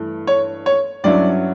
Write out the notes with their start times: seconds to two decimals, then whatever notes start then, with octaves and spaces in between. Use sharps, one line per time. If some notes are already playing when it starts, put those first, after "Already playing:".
Already playing: G2 E3 A3
0.27 C#5
0.66 C#5
1.04 G2 F#3 C#4 E4 D5